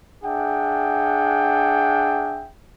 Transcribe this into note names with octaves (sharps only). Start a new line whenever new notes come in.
D4 G#4 E5 F#5 G5